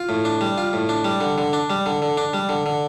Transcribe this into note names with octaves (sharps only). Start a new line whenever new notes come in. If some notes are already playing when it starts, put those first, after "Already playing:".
Already playing: F4
A2
D4
G3
F4
A2
D4
G3
D3
D3
D4
G3
D3
D3
D4
G3
D3
D3